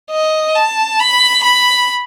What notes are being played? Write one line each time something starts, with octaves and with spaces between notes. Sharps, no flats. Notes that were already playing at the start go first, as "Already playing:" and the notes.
D#5
A5
B5
B5